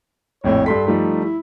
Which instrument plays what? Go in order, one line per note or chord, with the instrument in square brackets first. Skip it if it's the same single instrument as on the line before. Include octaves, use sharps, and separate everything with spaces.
[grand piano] A#1 F2 A2 [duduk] C#5
[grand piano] G2 C6 B6 [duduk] A4
[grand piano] F3 G3 A3 [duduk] D#4
[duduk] E4